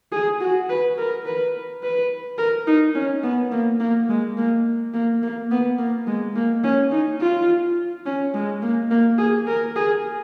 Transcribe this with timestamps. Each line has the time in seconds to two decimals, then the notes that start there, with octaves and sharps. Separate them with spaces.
0.12 G#4
0.40 F#4
0.69 B4
0.98 A#4
1.25 B4
1.83 B4
2.38 A#4
2.67 D#4
2.95 C#4
3.23 B3
3.52 A#3
3.80 A#3
4.09 G#3
4.37 A#3
4.94 A#3
5.22 A#3
5.51 B3
5.78 A#3
6.07 G#3
6.36 A#3
6.64 C#4
6.91 D#4
7.20 F4
8.06 C#4
8.34 G#3
8.62 A#3
8.91 A#3
9.18 G#4
9.47 A#4
9.76 G#4